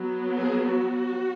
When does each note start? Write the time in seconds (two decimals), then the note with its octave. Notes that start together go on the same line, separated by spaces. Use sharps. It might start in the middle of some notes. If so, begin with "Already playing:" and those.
Already playing: F#3 B3
0.37 G#4
0.65 F#4